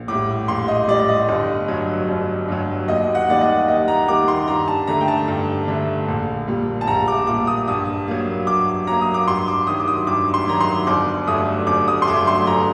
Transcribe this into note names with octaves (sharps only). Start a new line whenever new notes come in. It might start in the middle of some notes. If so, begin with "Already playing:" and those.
Already playing: A#1
A2 G3 D6
A#1 C6
D#5
A2 G3 D5
D#5
G1
G2 F#3
G1
G2 F#3
D#2 D#5
F#5
D#3 G3 A#3 D5
D#5
D#2 D#5
A#5
D#3 G3 A#3 D6
C6
G2 A#5
A5
D3 A3 A#5
G5
A5
G2
D3 A3
A#1
A#2 G3
A5
A#1 A#5
D6
A#2 G3 D6
D#6
G2 D#6
F#3 A#3
G2 D6
F#3 A#3 A#5
D#6
D6
G2 C6
D6
D#3 F#3 D#6
D6
D#6
G2 D6
C6
D#3 F#3 A#5
C6
G1 D6
G2 F#3 A3 D#6
G1 D6
D#6
C6
G2 F#3 A3 D6
C6
G1 A#5